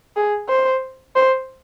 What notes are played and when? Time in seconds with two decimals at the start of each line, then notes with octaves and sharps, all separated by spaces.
0.16 G#4
0.49 C5
1.16 C5